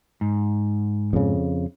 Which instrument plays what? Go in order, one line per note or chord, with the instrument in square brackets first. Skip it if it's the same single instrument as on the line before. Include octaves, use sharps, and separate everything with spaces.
[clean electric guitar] G#2
[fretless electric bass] F2 C#3